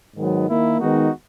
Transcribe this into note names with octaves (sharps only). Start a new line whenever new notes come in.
G#2 D#3 F#3 B3
D#3 A#3 E4
D#3 G#3 B3 D#4 F#4